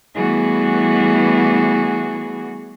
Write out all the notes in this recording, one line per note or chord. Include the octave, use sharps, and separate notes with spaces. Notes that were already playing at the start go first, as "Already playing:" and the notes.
E3 G3 A3 B3 F#4 G#4